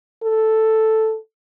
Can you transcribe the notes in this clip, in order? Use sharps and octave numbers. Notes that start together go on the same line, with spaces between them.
A4